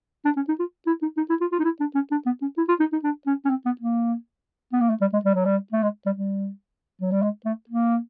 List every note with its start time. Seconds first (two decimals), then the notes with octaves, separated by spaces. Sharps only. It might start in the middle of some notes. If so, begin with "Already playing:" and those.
0.25 D4
0.36 C#4
0.48 D#4
0.59 F4
0.87 E4
1.02 D#4
1.17 D#4
1.29 E4
1.41 F4
1.52 F4
1.59 D#4
1.64 E4
1.80 D4
1.95 C#4
2.11 D4
2.26 B3
2.42 C#4
2.57 E4
2.68 F4
2.80 D#4
2.93 D#4
3.03 D4
3.26 C#4
3.45 C#4
3.50 C4
3.66 B3
3.81 A#3
4.72 B3
4.81 A#3
4.90 A3
5.01 G3
5.13 G#3
5.25 G3
5.35 F#3
5.45 G3
5.73 A3
5.83 G#3
6.06 G3
6.17 G3
7.01 F#3
7.11 G3
7.22 G#3
7.45 A3
7.69 A#3